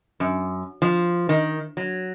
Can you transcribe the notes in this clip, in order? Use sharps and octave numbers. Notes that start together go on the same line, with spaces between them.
F#2
F3
D#3
F#3